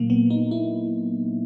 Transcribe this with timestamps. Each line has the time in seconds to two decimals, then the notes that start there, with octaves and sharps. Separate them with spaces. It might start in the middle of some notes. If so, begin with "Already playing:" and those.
Already playing: A#2 F#3 A#3
0.10 B3
0.30 D#4
0.51 E4